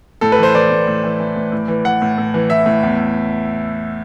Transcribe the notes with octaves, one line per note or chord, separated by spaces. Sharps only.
A2 A4
B4
E3 C5
E3 D5
A2
A2
E3
E3
A2
A2
E3
E3 F#5
A2
A2
E3
E3 E5
A2
E2